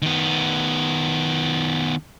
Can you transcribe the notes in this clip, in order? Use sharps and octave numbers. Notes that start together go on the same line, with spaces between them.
D#3 B3